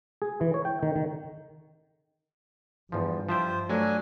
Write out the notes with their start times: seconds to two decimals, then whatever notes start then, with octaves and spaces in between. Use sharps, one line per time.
0.22 G#4
0.41 E3
0.54 C#5
0.65 G5
0.83 D#3
0.96 D#3
2.92 E2 G2 F3
3.29 F3 F4 C5 E5 G5
3.69 F#3 A3 D4 G#5